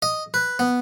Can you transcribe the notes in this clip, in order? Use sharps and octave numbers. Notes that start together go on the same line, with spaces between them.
D#5
B4
B3